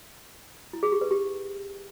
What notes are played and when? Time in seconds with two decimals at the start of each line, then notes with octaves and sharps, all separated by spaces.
0.73 E4
0.83 G#4
0.92 G4
1.01 B4
1.11 G4